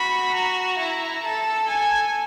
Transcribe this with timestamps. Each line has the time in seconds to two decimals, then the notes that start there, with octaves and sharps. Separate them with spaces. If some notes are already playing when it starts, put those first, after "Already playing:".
Already playing: F#4 B5
0.34 F#4 A#5
0.79 E4
1.23 A4 A5
1.68 G#5